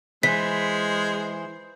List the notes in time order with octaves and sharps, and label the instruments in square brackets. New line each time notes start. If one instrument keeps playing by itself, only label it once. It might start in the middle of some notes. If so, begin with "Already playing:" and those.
[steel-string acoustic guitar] E3 [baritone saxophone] G#3 [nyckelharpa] C5 [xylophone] B6